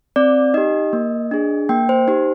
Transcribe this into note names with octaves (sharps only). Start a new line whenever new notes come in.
C4 D5
D#4 G4 D#5
A#3
D4 G#4
A#3 G5
C5
D#4 G4 C5